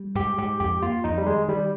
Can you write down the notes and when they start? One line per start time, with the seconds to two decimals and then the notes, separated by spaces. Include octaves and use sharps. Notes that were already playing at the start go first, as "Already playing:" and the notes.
Already playing: G3
0.15 G#2 G4
0.38 G#2 G4
0.60 F2 G4
0.82 A#3 F4
1.04 F2 D#4
1.18 G3
1.26 D#3 G#3
1.48 D#3 G3